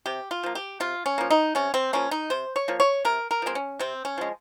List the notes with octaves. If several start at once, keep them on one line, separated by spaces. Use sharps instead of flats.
C3 G4
F4
F3 A#3
G4
C3 F4
C#4
F3 A#3
D#4
C3 C#4
C4
F3 A#3 C#4
D#4
C3 C5
C#5
F3 A#3
C#5
C3 A#4
A#4
F3 G#3 C4
C#4
C3 C4
C#4
F3 G#3